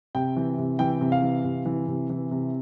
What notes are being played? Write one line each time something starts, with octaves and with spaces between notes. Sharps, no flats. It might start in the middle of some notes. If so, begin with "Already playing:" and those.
C3 G5
E3
C3
E3 G5
C3
F5
E3
C3
E3
C3
E3
C3